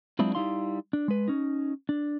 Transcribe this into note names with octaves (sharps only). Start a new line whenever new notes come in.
F#3 G#3 C4 D4 E4 F4
G3 D#4 E4 F5 C6
D4
G#3 B4
C#4 D#4
D4